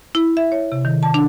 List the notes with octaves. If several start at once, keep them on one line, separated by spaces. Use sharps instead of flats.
E4
E5
C#5
C3
D#3
A5
D4